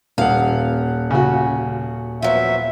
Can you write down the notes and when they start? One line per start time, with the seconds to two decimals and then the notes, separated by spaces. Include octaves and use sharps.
0.18 D#1 F5 F#5
1.11 C#3 F#4
2.22 F3 F#3 B3 E5